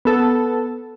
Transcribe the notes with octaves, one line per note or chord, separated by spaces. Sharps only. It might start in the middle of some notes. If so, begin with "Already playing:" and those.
B3 A4 A5